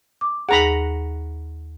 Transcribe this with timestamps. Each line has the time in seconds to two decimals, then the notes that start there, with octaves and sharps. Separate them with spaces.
0.21 D6
0.49 D#2 G#4 F#5 A#5 B5